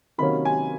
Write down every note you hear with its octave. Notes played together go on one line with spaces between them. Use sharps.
C3 D#3 F#3 A#3 C#4 B5
G#5